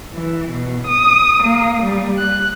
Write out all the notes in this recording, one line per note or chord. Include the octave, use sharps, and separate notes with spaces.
E3
B2
D#6
A#3
G3
F#6